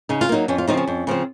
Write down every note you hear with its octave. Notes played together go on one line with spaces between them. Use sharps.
C#3 D#4
F4
F#3 A#3 D#4
F2 C#4
F4
C#3 F3 C4 D#4
C#4
F2
C#3 F3 C4